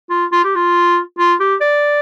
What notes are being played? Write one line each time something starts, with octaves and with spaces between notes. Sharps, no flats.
F4
F4
G4
F4
F4
G4
D5